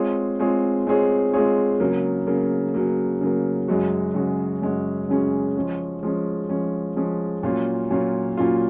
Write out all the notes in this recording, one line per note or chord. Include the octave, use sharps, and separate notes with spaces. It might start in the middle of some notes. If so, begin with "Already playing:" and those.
Already playing: G#3 C4 F4 G#4 C#5
G#3 C4 F4 G#4 C#5
G#3 C4 F4 G#4 C#5
G#3 C4 F4 G#4 C#5
C#3 F#3 A#3
C#3 F#3 A#3
C#3 F#3 A#3
C#3 F#3 A#3
F#2 C#3 G#3 C#4 F#4
F#2 C#3 G#3 C#4 F#4
F#2 C#3 G#3 C#4 F#4
F#2 C#3 G#3 C#4 F#4
F3 G#3 C#4
F3 G#3 C#4
F3 G#3 C#4
F3 G#3 C#4
A#2 F#3 C#4 F4
A#2 F#3 C#4 F4
A#2 F#3 C#4 F4